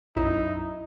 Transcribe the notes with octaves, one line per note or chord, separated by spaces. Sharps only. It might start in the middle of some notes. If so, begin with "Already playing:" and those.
B1 F#2 D#4 E4